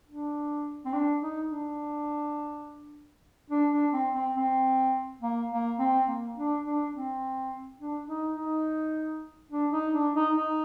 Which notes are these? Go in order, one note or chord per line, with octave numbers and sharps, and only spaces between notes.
D4
C4
D4
D#4
D4
D4
D4
C4
C4
C4
A#3
A#3
C4
A#3
D4
D4
C4
D4
D#4
D#4
D4
D#4
D4
D#4
D#4